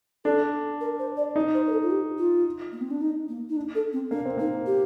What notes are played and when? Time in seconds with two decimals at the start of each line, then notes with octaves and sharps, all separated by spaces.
0.25 D4 A4
0.81 A#4
0.99 C5
1.17 D5
1.36 D#4
1.54 C5
1.67 A#4
1.72 A4
1.83 F4
1.90 G4
2.18 F4
2.72 A#3
2.81 C4
2.91 D4
3.01 D#4
3.29 A#3
3.49 D#4
3.57 D4
3.75 A4
3.93 C4
4.11 A#3 D4
4.25 C4
4.38 A#3 D#4
4.66 G4